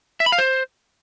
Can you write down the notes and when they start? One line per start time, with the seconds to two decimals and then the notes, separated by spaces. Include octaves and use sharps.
0.20 E5
0.26 B5
0.32 F5
0.39 C5